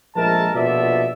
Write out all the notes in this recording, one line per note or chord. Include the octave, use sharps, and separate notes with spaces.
A#1 F3 G#3 A3 A#4 A5
A#1 B2 F4 A4 D5 E5